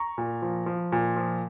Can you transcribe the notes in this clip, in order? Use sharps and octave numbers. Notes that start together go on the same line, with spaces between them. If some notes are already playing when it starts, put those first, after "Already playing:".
Already playing: A#5 C#6
A#2
F3
F3
A#2
F3